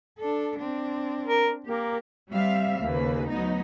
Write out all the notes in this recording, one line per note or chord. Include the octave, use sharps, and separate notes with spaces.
D4 A4
C4 D4
A#4
A#3 G4 A#4
G3 C4 E5 F5
D#2 C#3 A#3 B4
D2 F#3 B3 D#4